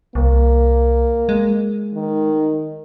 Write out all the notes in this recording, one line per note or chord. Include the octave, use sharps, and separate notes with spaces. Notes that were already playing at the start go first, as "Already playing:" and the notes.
C2 A#3
G#3
D#3